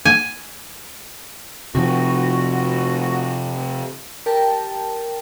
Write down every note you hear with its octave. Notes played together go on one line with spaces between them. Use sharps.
G#5
C3 F3 F#4
G4 A#4 G5 A5